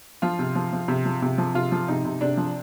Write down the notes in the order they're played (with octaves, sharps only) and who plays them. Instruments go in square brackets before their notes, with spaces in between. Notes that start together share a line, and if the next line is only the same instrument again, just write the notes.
[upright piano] F3 F4
C3
F3
F3
C3
F3
C3
F3
C3 F4
F3
C3 D#4
C3
C3 D4
F3